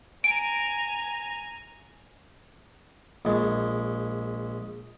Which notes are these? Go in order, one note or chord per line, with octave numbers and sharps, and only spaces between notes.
G#5 A#5 D7
A#1 G#3